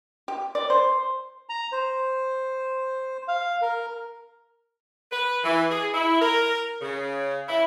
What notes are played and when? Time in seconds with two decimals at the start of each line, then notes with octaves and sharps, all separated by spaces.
0.28 G4
0.55 D5
0.70 C5
1.49 A#5
1.72 C5
3.28 F5
3.62 A#4
5.11 B4
5.43 E3
5.70 G#4
5.93 E4
6.20 A#4
6.81 C#3
7.47 E4